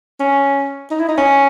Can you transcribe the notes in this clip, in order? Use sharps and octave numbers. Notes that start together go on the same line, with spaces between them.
C#4
D#4
E4
D#4
C#4